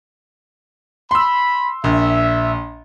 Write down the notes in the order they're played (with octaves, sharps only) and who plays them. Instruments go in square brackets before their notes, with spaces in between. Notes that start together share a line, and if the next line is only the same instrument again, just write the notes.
[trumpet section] B5 [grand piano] C6 E6
[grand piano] A#1 [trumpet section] E5